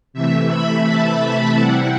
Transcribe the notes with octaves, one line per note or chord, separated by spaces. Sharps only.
C3 E3 A3 E5
B5
A5
C3 G3 C4 E4 F#5